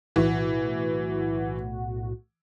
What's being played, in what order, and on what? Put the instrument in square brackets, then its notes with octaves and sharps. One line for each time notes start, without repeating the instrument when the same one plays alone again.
[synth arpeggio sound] B1 A2 F#4 [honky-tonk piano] E3